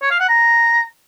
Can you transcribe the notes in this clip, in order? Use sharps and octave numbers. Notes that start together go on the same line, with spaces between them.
C#5
F5
F#5
A#5